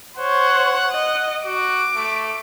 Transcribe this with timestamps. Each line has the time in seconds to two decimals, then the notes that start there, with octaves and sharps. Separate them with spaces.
0.17 C5 C#5 F#5
0.92 D#5
1.46 F#4 D6
1.96 A3